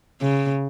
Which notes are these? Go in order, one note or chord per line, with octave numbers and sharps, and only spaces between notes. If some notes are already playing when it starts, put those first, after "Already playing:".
C#3